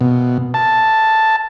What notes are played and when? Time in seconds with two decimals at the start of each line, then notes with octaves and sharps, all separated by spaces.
0.01 B2
0.54 A5